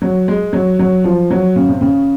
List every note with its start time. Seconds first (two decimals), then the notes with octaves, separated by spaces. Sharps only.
0.02 F#3
0.28 G#3
0.53 F#3
0.79 F#3
1.04 F3
1.30 F#3
1.56 C#3
1.69 C3
1.81 C#3